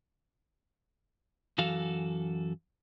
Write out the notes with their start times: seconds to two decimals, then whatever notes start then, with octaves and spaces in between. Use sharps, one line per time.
1.58 F#2 E3 F#4 A4 F5